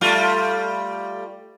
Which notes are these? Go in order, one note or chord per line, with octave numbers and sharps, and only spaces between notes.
G3 A3 F4